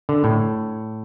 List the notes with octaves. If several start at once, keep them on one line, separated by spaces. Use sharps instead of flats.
D3
A2